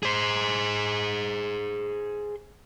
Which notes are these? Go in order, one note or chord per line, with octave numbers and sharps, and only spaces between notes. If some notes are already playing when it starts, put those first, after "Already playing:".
G#4 C5